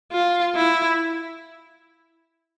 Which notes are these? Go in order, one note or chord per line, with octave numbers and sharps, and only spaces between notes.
F4
E4